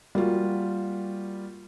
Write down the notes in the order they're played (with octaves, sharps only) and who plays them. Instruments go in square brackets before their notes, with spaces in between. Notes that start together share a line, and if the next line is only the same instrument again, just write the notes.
[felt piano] G3 A#3 F4 F#4